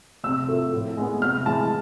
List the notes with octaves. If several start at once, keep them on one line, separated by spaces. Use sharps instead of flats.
C3 E6
F3 A3
A2
G#3 B3
C3 F6
E3 G#3 A5